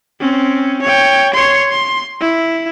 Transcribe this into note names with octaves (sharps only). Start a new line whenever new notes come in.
C4 C#4
C#5 G5
C#5 C6
C6
E4